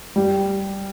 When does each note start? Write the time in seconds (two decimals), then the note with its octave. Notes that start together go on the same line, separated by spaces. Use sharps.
0.16 G3 G4